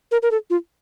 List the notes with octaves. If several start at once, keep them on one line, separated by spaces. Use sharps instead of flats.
A#4
A#4
A4
F4